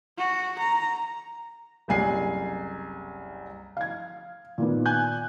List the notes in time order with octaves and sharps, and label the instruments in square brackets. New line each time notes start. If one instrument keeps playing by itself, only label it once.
[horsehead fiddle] F#4
A#5
[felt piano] F#1 C2 G#5 C7
F5 G#6
A#2 D#3 B3
[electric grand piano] G#5 F#6 G6